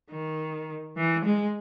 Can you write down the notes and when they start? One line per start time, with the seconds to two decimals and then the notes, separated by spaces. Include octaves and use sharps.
0.11 D#3
0.97 E3
1.25 G#3